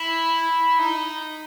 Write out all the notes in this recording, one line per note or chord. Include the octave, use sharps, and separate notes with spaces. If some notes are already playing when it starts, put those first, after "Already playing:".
Already playing: E4
D#4